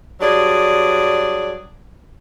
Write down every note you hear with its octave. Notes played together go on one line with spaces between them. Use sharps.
G2 F#3 G#4 D5